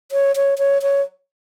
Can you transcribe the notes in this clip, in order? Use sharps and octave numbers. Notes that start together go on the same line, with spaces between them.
C#5
C#5
C#5
C#5